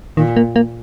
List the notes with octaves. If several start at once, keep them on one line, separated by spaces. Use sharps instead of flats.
A#2 D#3
A#3
A#3